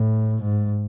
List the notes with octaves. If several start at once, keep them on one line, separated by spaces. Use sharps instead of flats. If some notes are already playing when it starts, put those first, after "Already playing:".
Already playing: A2
G#2